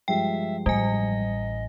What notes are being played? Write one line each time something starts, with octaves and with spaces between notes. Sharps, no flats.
G2 F3 G#3 E5 G5
A1 G3 D#5 G#5